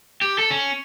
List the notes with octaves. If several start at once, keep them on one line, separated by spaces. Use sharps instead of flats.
G4
A4
C#4